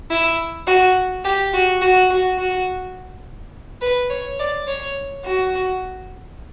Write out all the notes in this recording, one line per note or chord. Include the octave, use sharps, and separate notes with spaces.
E4
F#4
G4
F#4
F#4
F#4
F#4
B4
C#5
D5
C#5
F#4